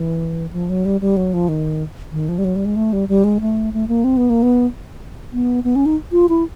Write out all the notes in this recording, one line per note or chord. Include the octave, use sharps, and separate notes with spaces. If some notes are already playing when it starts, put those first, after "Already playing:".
Already playing: E3
F3
F#3
G3
G3
F#3
F3
D#3
D#3
F3
G3
F#3
G3
G#3
A3
G3
G3
G#3
A3
A3
A#3
C4
B3
A#3
B3
B3
B3
C#4
D#4
F4
E4